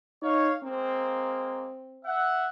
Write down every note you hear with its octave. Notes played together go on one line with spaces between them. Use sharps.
D#4 C#5 F5
G#3 A#3 C4
E5 F#5